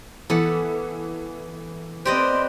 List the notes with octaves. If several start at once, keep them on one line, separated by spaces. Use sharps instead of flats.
E3 B3 A4
C4 G4 B4 C5 D5 D#5